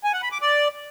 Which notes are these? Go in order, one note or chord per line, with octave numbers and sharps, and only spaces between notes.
G#5
F#5
B5
D6
D5